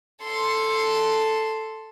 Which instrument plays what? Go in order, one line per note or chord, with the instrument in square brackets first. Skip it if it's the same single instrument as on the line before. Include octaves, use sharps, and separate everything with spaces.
[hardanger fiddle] A4 C6